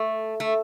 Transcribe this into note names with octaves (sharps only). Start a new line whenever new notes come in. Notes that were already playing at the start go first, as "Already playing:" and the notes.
Already playing: A3
A3